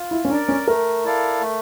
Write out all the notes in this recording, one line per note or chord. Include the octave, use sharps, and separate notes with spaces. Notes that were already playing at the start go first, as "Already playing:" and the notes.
Already playing: F4
E4
C#4
D4 A#4 D5
C#4
A3 A#4
E4 A4 D5 F5
A3